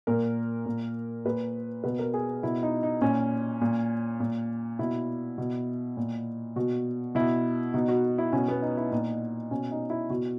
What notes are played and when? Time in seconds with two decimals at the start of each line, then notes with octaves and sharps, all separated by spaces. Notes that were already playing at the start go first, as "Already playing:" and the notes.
0.07 A#2 A#4
0.66 A#2
1.25 A#2 B4
1.84 B2 B4
1.99 A#4
2.14 G#4
2.43 B2 E4
2.63 D#4
2.83 D#4
3.02 A#2 C#4
3.61 A#2
4.20 A#2
4.79 B2 E4
5.38 B2
5.97 A#2
6.56 B2 F#4
7.15 B2 E4
7.74 B2 D#4
7.88 F#4
8.18 E4
8.32 B2 C#4
8.48 B3
8.62 D#4
8.77 E4
8.91 A#2 D#4
9.51 B2 C#4
9.71 D#4
9.90 E4
10.10 B2 F#4